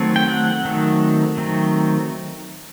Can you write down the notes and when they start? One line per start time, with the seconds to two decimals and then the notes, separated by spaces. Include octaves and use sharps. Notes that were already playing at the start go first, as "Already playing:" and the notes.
Already playing: D#3 F#3 A3 C4
0.16 G5
0.28 F#5
0.64 D#3 F#3 A3 C4
1.37 D#3 F#3 A3 C4